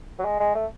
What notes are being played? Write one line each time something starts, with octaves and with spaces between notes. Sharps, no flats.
F#3
G#3
G#3
A3